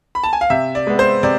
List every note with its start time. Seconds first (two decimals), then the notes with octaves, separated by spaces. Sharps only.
0.15 B5
0.23 A5
0.33 G#5
0.41 F5
0.50 C3 E5
0.75 D5
0.87 G#3 B3
0.99 C5
1.23 C3 D5